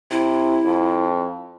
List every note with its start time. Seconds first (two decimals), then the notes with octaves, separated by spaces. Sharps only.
0.11 C3 E4
0.65 F2